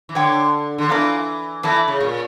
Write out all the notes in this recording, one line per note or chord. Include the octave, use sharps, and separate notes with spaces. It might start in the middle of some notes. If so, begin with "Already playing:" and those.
E3
D3 C#5 G5 D6
D3
E3 F4 A#4 D5 F5
E3 E4 A4 D5
C#3
A#2